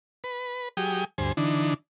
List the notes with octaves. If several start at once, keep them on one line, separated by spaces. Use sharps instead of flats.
B4
F#3 G4 G#4 G5 D#6
D2 G2 C5 G#5
D3 E3 D4 D#4